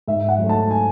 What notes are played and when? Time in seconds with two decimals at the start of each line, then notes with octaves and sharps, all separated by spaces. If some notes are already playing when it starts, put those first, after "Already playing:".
0.08 G#2 E5
0.28 F#5
0.39 F#3
0.44 A3
0.49 A5
0.71 G#5